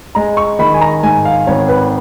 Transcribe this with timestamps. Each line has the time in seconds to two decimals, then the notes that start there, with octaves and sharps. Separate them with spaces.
0.15 G#3 A#5
0.37 C#6
0.59 D#3 B5
0.74 G#5
0.81 A#5
1.03 G#2 G#5
1.25 F5
1.47 G#1 C#5
1.68 B4